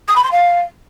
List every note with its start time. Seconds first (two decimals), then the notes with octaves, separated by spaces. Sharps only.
0.08 D#6
0.16 B5
0.23 C6
0.31 F5